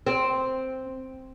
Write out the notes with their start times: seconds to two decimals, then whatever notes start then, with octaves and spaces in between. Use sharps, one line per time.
0.07 C4